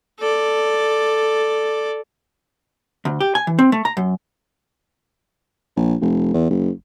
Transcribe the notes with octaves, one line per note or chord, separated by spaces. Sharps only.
A4 D5
D2
G4
G#5
E3
C4
A3
A#5
F#2
A#1
F1
E2
F#1